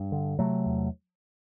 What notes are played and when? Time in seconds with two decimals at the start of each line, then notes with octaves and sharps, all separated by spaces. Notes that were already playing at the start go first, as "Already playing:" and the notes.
Already playing: G2
0.12 D3
0.39 C3 F#3 A3
0.66 E2